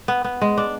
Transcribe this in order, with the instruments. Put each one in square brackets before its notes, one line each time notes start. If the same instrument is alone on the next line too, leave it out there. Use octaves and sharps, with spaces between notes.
[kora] B3
B3
G#3
D4